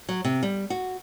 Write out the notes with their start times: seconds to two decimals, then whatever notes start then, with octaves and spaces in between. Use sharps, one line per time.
0.09 F#3
0.24 C3
0.43 G3
0.70 F#4